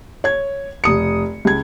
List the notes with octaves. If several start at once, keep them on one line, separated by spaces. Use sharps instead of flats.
C#5 G#6
F1 D#6 C#7
C#2 G#6